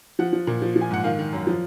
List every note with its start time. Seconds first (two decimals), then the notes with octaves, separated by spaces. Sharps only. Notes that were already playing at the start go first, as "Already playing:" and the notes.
0.19 F3 F#5
0.33 F3
0.47 A#2
0.62 F3
0.76 F3
0.81 G#5
0.91 G#2 F#5
1.04 D#3 F5
1.19 D#3
1.33 F#2
1.47 F3